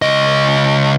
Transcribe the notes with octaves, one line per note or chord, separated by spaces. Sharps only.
C#2 D#5